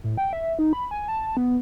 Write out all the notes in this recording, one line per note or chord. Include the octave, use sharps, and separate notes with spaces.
A2
G5
E5
D#4
B5
G#5
A5
B3